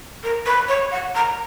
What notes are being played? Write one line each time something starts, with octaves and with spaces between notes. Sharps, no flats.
A#4
B4
C#5
F#5
A#5